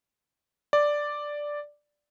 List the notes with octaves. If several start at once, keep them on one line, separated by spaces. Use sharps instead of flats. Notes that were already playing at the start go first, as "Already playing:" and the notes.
D5